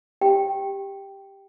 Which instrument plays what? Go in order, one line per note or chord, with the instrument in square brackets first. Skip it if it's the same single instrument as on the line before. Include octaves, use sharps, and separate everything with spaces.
[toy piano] G4 G5